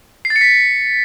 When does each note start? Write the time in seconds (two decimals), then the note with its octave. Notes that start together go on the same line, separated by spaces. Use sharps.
0.25 C7
0.30 A6
0.36 C#7
0.41 B6